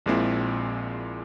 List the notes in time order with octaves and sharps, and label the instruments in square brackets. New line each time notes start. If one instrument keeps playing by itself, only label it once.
[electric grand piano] A#1 A#2 G#3 C4 E4